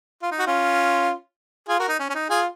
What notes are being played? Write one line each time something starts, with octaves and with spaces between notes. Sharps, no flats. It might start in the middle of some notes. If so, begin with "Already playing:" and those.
F4
D#4
F#4
C#4 F4
F4 G#4
F#4 A#4
D#4
C#4
C#4
D#4
F4 G#4